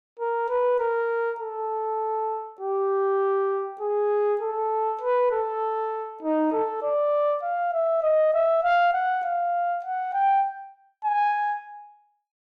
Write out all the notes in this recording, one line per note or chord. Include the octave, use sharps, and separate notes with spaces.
A#4
B4
A#4
A4
G4
G#4
A4
B4
A4
D#4
A4
D5
F5
E5
D#5
E5
F5
F#5
F5
F#5
G5
G#5